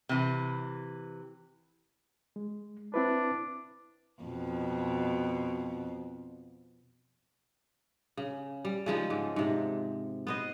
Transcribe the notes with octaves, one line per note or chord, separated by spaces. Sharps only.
C3 E3
G#3
C4 D4 E4 B4
F2 B2
C#3
G3
C#3 F3 G#3 D#4
G#2
G#2 C3
B3 C5 D#5